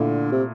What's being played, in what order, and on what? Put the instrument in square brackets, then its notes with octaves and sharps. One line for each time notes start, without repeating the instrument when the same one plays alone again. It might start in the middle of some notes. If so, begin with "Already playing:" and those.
Already playing: [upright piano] A#2 A3 E4 [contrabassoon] D3
[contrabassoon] C3